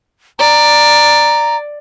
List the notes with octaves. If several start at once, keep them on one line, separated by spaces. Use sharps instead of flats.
D5 A#5